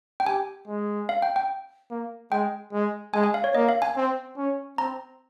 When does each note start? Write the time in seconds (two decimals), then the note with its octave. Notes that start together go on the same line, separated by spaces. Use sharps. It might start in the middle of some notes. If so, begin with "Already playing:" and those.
0.20 G5
0.26 G4 G#5
0.67 G#3
1.09 F5
1.22 G5
1.36 G5
1.91 A#3
2.32 G#3 G5
2.73 G#3
3.14 G#3 G#5
3.24 G#5
3.34 F5
3.44 C#5
3.55 A#3 D#5
3.69 F5
3.82 G#5
3.96 C4
4.37 C#4
4.78 C4 A#5